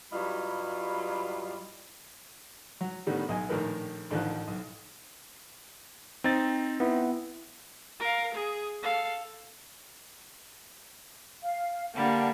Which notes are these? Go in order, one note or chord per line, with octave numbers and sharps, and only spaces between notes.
G2 F#3 G3 E4 F4 D#5
F#3
A2 D3 D#3 G3 B3
B1 D#5 G#5
A#1 A2 D#3 A#4 B4
A1 D3 D#3 F3 F#6
B1
C4 D#4 A6
B3 E4
A#4 F5
G#4
A4 F5
F5
D3 G3 A#3 D4 F#5